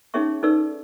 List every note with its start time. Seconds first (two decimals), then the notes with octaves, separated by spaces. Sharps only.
0.14 C#4 D#4 G#4 C#5 E5 C#6
0.43 D#4 A4 B4 D5 E6